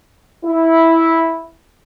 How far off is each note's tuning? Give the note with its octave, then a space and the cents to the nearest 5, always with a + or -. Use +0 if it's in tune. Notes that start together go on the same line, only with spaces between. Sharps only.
E4 -10